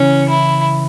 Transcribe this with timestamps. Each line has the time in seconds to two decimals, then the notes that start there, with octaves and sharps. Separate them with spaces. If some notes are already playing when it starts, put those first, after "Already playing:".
Already playing: C#3 E3 C#4
0.29 E4